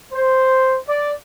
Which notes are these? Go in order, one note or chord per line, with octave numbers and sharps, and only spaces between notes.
C5
D5